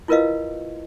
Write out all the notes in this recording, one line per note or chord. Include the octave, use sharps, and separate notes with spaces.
E4 F4 A#4 B4 D#5 F5